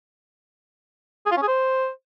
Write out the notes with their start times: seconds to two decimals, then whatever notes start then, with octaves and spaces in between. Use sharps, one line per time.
1.26 G#4
1.31 F4
1.37 C#4
1.42 G#4
1.48 C5